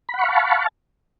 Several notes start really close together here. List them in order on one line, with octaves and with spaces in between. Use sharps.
B5 F#5 C#6 F5 A5